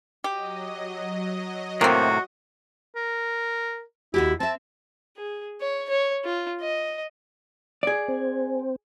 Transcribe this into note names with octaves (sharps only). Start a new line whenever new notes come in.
F#3 G4 D#5
A2 C3 D#3 A#3 C4 F#4
A#4
D#2 E4 F#4 G4
C4 E5 A5
G#4
C#5
C#5
F4
D#5
G#4 D5
C4